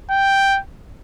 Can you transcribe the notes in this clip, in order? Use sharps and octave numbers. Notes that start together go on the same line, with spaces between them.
G5